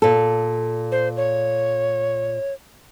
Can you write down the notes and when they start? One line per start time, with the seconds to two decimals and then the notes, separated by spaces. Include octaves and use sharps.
0.02 A#2 A4
0.92 C5
1.17 C#5